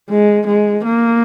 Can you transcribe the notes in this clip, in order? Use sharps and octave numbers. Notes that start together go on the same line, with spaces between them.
G#3
G#3
A#3